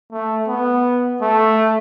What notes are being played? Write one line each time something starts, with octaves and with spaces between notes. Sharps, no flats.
A3
B3
A3